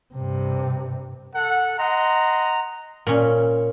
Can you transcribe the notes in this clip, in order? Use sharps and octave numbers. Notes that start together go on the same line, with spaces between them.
G2 C3
A4 F#5
D#5 F#5 A#5 C6
A#2 C#4